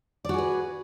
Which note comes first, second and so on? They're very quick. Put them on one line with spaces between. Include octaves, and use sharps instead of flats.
D5 F#4 G#4 B4